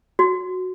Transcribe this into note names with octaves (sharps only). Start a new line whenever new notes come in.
F#4